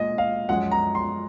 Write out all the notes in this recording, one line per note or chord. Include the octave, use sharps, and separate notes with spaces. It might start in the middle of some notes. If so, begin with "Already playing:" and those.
Already playing: A#2 G#3 D#5
F5
F#2 F3 G#3 F#5
A#5
C6